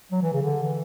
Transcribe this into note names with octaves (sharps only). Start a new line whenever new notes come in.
F#3
E3
C#3
D3
E3